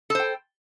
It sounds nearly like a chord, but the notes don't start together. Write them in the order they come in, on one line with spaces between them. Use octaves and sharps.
A4 C5 G5